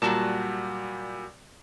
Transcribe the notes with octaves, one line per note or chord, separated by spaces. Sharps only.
A#2 F#3 G3 F#4 A5